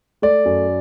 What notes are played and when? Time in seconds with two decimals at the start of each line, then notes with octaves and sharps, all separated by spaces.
0.22 A3 D5
0.45 F#2